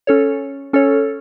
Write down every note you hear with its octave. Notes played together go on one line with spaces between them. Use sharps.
C#4 A4 C#5
C#4 A4 C#5